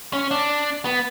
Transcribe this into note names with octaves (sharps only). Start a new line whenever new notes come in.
C#4
D4
B3